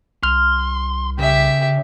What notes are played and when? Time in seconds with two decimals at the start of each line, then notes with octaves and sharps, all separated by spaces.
0.23 C2 C6 F6
1.19 C#3 G4 E5